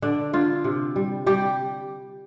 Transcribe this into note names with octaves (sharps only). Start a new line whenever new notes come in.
D3 D4
D3 F4
C3
G3
G3 G4